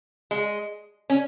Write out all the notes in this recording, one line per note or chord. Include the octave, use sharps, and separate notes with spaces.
G#3
C#4